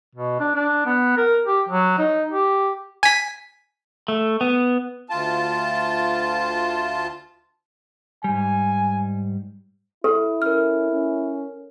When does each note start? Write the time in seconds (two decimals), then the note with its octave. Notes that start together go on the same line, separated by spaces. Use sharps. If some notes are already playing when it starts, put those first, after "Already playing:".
0.15 B2
0.40 D4
0.55 D4
0.86 B3
1.17 A#4
1.45 G4
1.69 F#3
1.98 D#4
2.31 G4
3.03 G#5 B6
4.08 A3
4.41 B3
5.10 D2 F4 A5
8.24 G#2 G3 G#5
10.04 E4 A4
10.42 C#4 A#4 F6
10.92 C#4